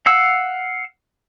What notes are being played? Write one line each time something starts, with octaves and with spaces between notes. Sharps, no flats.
F5 F#5 E6